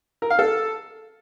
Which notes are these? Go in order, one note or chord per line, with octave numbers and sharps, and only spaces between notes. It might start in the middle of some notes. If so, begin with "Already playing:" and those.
A#4
F5
A4